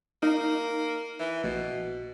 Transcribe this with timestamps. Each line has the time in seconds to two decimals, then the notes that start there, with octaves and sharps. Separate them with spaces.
0.23 A#3 D#4
1.19 E3
1.44 A#1 B2